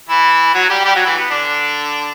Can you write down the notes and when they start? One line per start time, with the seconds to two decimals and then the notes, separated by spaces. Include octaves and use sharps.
0.09 E3 E4
0.54 F#3 F#4
0.70 G3 G4
0.84 G3 G4
0.95 F#3 F#4
1.05 E3 E4
1.16 B3
1.31 D3 D4